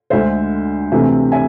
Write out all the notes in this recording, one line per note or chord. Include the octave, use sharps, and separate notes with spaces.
D2 D3 G#3 C5 E5
D2 C3 E3 A3 C4 E5 G#5
E5 G#5